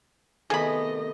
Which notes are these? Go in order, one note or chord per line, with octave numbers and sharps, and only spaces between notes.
C3 D#3 A3 B3 G#4 D#5 B5